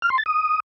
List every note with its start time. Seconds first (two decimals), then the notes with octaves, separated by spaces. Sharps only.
0.02 F6
0.10 C6
0.18 A6
0.26 D#6